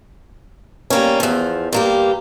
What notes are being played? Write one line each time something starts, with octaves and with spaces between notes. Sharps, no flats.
G3 A#3 C#4
E2 F3
G2 A#3 G4